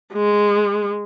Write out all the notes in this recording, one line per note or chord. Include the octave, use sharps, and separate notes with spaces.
G#3